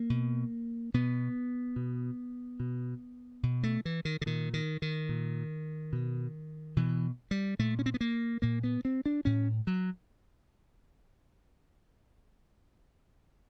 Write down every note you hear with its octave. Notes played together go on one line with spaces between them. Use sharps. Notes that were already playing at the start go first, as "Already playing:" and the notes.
Already playing: A#3
B2
B2 B3
B2
B2
B2
A3
E3
D#3
D3
A#2 D#3
D#3
D#3
A#2
B2
B2 E3
G3
A#2 A3
C#4
C4
B3
A#3
A#2 A#3
B3
C4
D4
A2 C#4
F#3